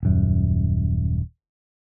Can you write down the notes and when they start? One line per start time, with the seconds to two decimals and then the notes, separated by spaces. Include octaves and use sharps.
0.03 D#1 F#2